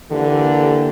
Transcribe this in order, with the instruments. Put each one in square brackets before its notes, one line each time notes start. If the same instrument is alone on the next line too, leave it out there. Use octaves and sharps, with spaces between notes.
[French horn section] D3 E3 A#3 G4 A4